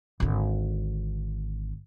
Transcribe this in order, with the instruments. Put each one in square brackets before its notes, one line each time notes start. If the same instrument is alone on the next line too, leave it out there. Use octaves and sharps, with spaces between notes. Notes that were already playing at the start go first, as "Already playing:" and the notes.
[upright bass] G#1 D3